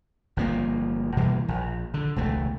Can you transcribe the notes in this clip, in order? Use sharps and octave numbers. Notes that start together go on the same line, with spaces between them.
G1 F3 A#3
B2 E3 G3 A#3
A#1
D3
E1 C#2 A3